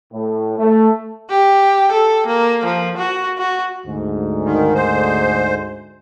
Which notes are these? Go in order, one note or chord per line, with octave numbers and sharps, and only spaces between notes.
A2
A3
G4
A4
A#3
F3
F#4
F#4
D2 G#2
D#3
C5